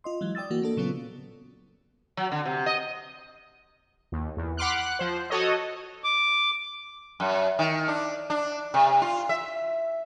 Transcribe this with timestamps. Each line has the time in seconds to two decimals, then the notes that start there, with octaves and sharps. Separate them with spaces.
0.04 F4 D#5 C6
0.21 E3 F#3 G#3
0.35 D5 G5 D#6 E6 A6
0.50 E3 A#3 F#4
0.62 A#3 D4 A4
0.77 A#2 C#3 F#3 B3 C#4 F4
2.17 F#3
2.32 D3
2.45 C3
2.66 D#5
4.12 D#2
4.37 E2
4.57 F#5 B5 C6 D6 F6 F#6
4.76 F#5 F#6
4.99 F3 C5
5.30 F#4 A4 C#5 D#5
6.04 D6
7.20 F#2
7.59 D#3
7.88 D4
8.30 D4
8.74 C3
9.02 F4
9.29 E5